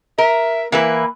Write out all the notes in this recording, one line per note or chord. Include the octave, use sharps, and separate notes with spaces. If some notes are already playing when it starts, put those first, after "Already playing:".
A#4 E5
E3 A#3 E4 B4